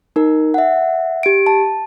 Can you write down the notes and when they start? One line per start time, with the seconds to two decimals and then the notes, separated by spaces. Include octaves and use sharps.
0.16 D#4 A#4
0.54 E5 F#5
1.23 G4 D7
1.46 A5